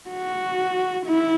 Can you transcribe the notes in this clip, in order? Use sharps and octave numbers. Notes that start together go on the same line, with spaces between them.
F#4
E4